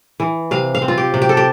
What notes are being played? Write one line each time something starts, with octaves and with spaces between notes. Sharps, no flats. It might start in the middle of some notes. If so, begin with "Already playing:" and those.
E3
C3 F5
F5
C4
F4
G4
C3
G4
A4
G4